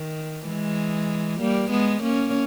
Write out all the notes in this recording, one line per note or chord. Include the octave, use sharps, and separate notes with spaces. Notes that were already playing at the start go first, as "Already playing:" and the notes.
Already playing: D#3
E3 G#3
G3 A#3
G#3 B3
A#3 C#4